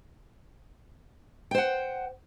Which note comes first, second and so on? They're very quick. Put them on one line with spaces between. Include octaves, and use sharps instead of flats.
G5 C5 F#5